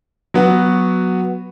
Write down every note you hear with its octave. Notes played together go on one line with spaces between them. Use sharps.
F#3 B3 F#4